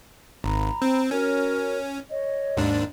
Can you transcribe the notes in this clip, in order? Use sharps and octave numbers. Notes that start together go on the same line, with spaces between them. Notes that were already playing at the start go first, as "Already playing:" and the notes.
G#1 A#5 B5
C4
C#4 F#4 A#4
C#5 D#5
D#2 G#2 D4